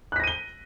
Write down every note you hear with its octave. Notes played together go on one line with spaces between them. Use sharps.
F#6 A#6 B6 D#7 G7